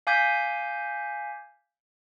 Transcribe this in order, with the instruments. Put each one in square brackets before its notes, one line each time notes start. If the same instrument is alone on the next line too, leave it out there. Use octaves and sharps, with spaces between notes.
[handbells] F5 G#5 D6 G6 G#6 B6